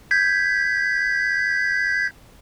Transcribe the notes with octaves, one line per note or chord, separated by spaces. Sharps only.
G6 G#6 B6